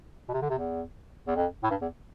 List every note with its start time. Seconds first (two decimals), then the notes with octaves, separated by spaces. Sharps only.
0.29 B2
0.34 C3
0.42 D3
0.50 C3
0.59 E2
1.28 E2
1.36 F2
1.64 A2
1.71 G2
1.82 E2